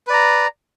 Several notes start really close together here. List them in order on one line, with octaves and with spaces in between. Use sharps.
B4 D5 A#5